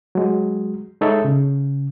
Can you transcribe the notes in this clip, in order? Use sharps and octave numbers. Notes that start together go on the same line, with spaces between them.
F#3 G#3
G#3 D#4 A4 C#5 E5
C#3